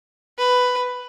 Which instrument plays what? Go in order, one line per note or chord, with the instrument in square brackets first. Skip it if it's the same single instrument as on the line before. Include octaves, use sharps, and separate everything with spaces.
[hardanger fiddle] B4